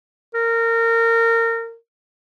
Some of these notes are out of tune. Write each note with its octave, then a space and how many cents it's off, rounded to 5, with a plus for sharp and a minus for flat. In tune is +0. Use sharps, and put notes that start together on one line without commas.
A#4 -25